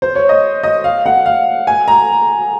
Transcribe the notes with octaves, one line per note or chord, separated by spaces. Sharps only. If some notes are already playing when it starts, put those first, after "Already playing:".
C5
C#5
D#5
D#5
F5
F#5
F5
G#5
A#5